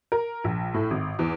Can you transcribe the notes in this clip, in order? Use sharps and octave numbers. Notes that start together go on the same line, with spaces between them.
A#4
A#1
A2
G#1
E2